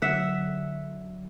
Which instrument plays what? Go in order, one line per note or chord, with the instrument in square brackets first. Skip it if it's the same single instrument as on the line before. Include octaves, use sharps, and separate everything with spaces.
[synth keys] D3 F#3 [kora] E5 F#5